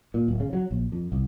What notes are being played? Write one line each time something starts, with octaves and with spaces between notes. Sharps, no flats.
A#2
D1
C#3
F#3
A#1
F2
C2